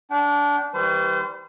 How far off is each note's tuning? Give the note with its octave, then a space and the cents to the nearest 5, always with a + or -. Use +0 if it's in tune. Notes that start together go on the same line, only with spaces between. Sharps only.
D4 -20 G5 -40
E3 -35 G3 +0 C5 -35